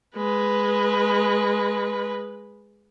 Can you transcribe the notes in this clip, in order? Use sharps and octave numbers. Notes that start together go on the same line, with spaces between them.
G#3 B4